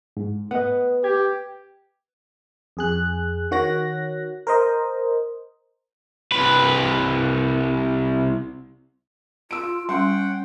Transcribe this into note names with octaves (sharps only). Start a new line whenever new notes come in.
G#2
B3 D#5 F#5
G4 G#6
F2 G#4 F#6
D#3 F#4 C#5 F#6 A#6
A#4 C5 D#5
C2 B4
F4 E6 D7
G3 C#4 F#5 G5 C6